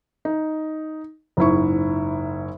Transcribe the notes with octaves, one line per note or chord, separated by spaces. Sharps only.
D#4
F#1 G#2 E4 C#6